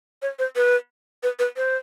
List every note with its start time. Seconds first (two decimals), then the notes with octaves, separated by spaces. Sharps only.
0.22 C#5
0.39 C5
0.56 B4
1.23 B4
1.39 B4
1.57 C5